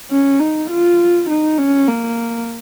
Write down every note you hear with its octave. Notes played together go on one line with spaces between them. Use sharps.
C#4
D#4
F4
D#4
C#4
A#3